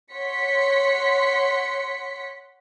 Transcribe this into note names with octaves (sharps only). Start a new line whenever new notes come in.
C#5 F#5 C6 B6 C#7